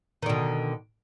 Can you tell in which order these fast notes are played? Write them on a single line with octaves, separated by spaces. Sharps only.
D#3 D3 B2